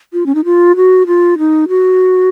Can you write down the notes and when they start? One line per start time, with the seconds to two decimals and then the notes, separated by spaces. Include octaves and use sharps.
0.13 F4
0.26 C#4
0.35 D#4
0.45 F4
0.76 F#4
1.07 F4
1.38 D#4
1.68 F#4